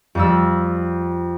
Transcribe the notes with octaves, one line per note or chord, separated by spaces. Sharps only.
F2 G3 E6